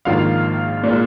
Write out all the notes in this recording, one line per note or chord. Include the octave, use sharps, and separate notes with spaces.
A#1 G#2 D#3 A#3 F4 F5
A#2 G#3 F4